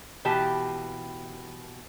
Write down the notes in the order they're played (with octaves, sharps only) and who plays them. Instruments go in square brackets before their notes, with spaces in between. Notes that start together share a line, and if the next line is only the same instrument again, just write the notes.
[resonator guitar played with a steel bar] B2 E3 G4 A5